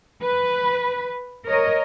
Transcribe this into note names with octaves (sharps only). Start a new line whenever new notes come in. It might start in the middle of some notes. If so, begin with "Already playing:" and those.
B4
A#4 C#5 D#5